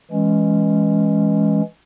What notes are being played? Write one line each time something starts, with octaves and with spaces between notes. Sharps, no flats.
E3 G#3 C#4